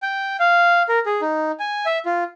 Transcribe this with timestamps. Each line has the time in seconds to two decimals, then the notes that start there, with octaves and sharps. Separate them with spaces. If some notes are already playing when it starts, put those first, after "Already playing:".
0.02 G5
0.40 F5
0.89 A#4
1.06 G#4
1.22 D#4
1.59 G#5
1.86 E5
2.06 F4